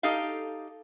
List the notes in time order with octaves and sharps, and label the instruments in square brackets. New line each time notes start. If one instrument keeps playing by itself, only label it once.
[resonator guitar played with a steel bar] D#4 G4 A4 F5